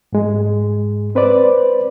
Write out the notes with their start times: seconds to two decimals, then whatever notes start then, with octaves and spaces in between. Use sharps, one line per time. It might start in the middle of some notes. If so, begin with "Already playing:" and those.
0.13 G#2 G#3
1.15 C4 B4 C5 D5